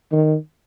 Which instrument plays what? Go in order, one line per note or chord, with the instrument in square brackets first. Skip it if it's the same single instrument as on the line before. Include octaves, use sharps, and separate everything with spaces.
[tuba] D#3